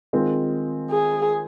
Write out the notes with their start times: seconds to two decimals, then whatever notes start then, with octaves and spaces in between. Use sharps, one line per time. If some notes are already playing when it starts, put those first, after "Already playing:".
0.13 D#3 G#3 C4 F4
0.91 G#4